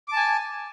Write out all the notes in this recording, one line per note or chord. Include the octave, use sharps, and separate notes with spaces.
G#5 A5 D6